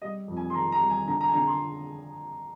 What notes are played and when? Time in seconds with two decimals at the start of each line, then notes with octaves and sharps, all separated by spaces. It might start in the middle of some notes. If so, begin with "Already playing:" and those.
0.02 G3 D#5
0.28 F2
0.37 G#5
0.50 C6
0.54 D#3 A#5
0.72 A#5
0.81 G3
0.90 G#5
1.06 D3 A#5
1.20 A#5
1.28 G#5
1.33 D3 A#5
1.47 C6